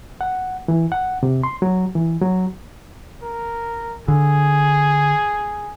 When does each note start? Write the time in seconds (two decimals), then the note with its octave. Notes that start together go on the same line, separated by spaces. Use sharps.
0.21 F#5
0.68 E3
0.92 F#5
1.23 C3
1.43 C6
1.62 F#3
1.95 E3
2.21 F#3
3.22 A#4
4.08 D3 G#4